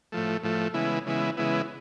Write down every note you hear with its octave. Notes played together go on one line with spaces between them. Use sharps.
A2 F3 A3
A2 F3 A3
C#3 E3 G#3 B3 E4
C#3 E3 G#3 B3 E4
C#3 E3 G#3 B3 E4